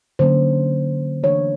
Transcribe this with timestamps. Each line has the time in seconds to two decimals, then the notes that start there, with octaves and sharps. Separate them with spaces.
0.19 D3 F#3 A#3 C#4 C5
1.23 E3 A3 D4 C#5